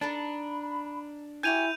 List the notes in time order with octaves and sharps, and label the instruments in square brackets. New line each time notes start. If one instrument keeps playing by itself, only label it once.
[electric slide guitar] D4 [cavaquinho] D#4 A4 A5 [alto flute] B5
[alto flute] E4 [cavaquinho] F#4 G4 G#5 [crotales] G6 D#7 F7